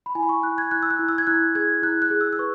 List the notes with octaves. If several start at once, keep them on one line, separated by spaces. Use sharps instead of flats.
B5
E4 G#5
B5
C#6
E4 F#6
G#6
E4 F#6
E6
F#6
E4
E6
G#6
E4 F#6
G#4 G#6
E4 F#6
F#6
G#4
E6
E6
B4 C#6